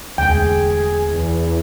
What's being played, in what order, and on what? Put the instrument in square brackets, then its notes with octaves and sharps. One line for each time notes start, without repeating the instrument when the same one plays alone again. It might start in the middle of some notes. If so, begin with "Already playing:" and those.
[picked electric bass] E1 D2 [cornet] G#4 [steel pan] G5
[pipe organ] E2